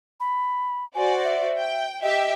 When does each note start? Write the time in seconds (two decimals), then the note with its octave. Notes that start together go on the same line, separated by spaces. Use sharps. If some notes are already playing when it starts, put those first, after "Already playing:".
0.20 B5
0.95 F#4 C5 D5 G#5
1.24 E5
1.58 G5
2.02 G4 D#5 E5